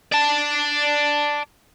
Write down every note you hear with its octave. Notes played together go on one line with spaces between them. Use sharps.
D5 A5